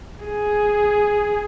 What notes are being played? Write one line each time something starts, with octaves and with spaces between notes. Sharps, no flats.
G#4